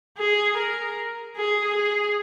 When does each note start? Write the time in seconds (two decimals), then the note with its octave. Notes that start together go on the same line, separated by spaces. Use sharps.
0.18 G#4
0.57 A#4
1.36 G#4
1.75 G#4